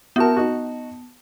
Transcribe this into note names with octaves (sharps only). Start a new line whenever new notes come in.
B3 E4 F#4 A#4 A5
D#4 F#4